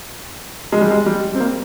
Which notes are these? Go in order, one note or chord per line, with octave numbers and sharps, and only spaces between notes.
G#3
G3
G#3
G3
C4
A#3